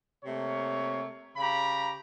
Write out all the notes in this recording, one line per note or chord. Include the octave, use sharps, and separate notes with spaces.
C3 A3 A#3 C#5
C#3 G4 A#5 B5